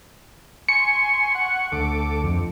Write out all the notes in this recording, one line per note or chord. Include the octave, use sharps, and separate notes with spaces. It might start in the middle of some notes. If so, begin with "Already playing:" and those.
G#5 C6 C#6 C#7
F#5 C#6
D2 A4 D6
F2